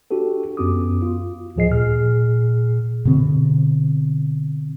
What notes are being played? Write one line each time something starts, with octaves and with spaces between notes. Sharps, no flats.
D4 F#4 G4 A4
F#2 B3 C#4 F#4 D6 D#6
F4
D2 A2 F3 G#4 D#5 C7
A#2 G#4 F6
B2 D3 C4